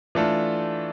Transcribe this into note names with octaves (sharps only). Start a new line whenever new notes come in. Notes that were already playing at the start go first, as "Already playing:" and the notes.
E3 A3 D4 F4 A4